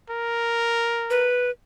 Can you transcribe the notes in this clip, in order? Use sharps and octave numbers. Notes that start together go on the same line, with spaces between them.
A#4
B4